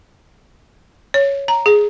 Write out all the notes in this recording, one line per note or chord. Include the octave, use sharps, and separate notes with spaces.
C#5
A#5
G#4